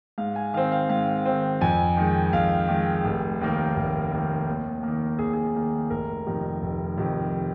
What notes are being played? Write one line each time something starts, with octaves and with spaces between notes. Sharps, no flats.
G#2 F5
G#5
D#3 C4 F5
F5
G#2 F5
D#3 C4
F2 G#5
D#3 G#3
F2 F5
D#3 G#3
F1
D#2 D#3 A#3
F1
D#2 D#3 A#3
D#2
D#3 A#3
D#2 G#4
G#4
D#3 A#3
F1 A#4
F2 C3 D#3
F1
F2 C3 D#3